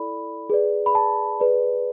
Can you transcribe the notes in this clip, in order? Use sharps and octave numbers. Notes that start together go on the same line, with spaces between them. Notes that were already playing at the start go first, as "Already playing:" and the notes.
Already playing: E4 A4 D5 B5
G#4 B4 D5
B5
A5
G#4 B4 D5